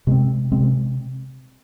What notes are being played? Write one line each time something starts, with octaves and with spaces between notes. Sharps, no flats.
C3 G#3 C4
C3 G#3 C4